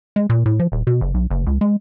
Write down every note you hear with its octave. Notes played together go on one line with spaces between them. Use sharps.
G#3
A#2
A2
F3
D#1
B2
F#1
B1
F#1
C#2
G#3